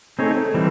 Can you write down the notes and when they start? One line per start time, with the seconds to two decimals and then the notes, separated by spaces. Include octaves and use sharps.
0.18 A3 C4 D#4 G#4 C#5
0.54 E3 G3 C4